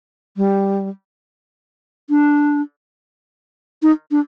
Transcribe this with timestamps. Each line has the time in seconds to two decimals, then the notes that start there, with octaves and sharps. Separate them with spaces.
0.37 G3
2.10 D4
3.83 D#4
4.11 D4